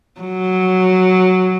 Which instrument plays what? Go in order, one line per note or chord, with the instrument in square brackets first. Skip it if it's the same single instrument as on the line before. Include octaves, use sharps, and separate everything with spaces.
[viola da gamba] F#3